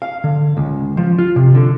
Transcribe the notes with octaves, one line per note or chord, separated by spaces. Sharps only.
F5
D3
C#2
F3
F4
C3
D3